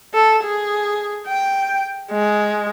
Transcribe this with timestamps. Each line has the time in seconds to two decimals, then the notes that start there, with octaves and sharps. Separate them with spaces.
0.14 A4
0.44 G#4
1.28 G5
2.11 G#3